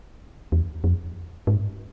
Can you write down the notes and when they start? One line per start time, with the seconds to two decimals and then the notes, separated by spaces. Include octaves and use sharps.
0.52 E2
0.84 F2
1.47 G#2